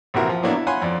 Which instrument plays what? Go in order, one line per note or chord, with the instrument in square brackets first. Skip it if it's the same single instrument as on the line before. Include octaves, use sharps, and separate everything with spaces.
[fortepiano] A#1 C3 E3 E4 F#4 A#4
F3
A2 F#3 A#3 B3 D4 E4
E4
F4 C#5 F#5 G#5 B5 C6
F2 D5